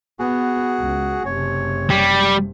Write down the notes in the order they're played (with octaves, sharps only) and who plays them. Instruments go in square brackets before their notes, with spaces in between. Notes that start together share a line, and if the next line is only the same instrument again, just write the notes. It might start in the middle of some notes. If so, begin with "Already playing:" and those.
[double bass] B3 [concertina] F#4 G#4
[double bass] C#2
[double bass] F#1 C3 [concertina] C#5
[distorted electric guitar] G3